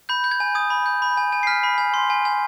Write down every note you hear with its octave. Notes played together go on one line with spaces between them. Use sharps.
B5 G6
G6
G#6
G#5
D#6 G#6
B5
G6
B5
G#5
G#5
C7
F6 B6
B5
G#5
C6
G#5
G#5